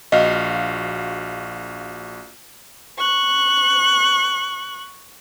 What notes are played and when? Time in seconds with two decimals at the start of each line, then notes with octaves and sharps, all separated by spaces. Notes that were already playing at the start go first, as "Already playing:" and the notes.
0.12 A#1 F#4 D#5 F5
2.98 C#6 F#6